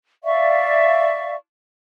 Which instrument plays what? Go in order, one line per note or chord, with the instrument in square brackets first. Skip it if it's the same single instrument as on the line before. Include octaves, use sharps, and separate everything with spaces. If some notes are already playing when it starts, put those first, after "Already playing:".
[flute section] D5 E5 F5 C#6